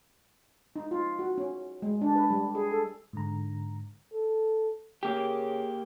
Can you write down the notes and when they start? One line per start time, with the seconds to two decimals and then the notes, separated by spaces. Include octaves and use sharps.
0.76 D#4
0.91 F4
1.19 F#4
1.38 C#4
1.82 G#3
2.02 D4
2.15 B4
2.30 G3
2.55 G#4
2.71 A4
3.13 G#2 D3 A#5
4.12 A4
5.03 C#3 A#3 G4